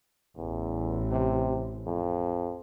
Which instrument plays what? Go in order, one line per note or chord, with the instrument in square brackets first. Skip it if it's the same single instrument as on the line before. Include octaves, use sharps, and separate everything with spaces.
[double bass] A1 [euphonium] E2
[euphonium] C3
F2